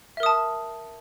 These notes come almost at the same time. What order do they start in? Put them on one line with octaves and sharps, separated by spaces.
E5 A#4 D#6 A5